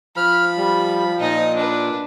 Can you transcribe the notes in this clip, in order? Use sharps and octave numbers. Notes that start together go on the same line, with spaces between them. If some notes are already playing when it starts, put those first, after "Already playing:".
F3 B5 F6
G3
A#2 D#4 D#5
D4 B4